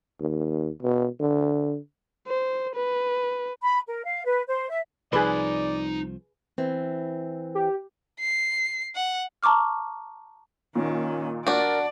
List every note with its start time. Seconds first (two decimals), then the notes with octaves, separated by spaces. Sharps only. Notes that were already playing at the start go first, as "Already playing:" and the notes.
0.20 D#2
0.82 B2
1.20 D3
2.27 C5
2.75 B4
3.62 B5
3.88 A#4
4.05 F5
4.24 B4
4.48 C5
4.69 E5
5.13 C2 F3 D#4 G#4 B4 D5 C6
6.58 E3 C4
7.55 G4
8.20 C7
8.95 F#5
9.43 A5 A#5 C#6 D6 F6
10.75 A#2 D#3 C#4
11.47 D4 F#4 A#4 D5